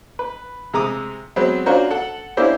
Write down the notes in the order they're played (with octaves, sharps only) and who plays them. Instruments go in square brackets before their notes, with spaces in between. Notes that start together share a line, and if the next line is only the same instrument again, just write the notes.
[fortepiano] B4
C3 G#3 A#5 D6 D#6
F#3 G#3 B3 C4
C#4 D4 F4 F#4 A#4 C5
A4 F#5
A#3 C#4 D4 E4 G4 C5